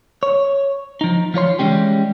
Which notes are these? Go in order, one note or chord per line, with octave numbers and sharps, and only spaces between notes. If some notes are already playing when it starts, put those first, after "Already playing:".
C#5
F3 D#4
F3 F4 C#5 C6
E3 F3 G3 G#3 C#4 G4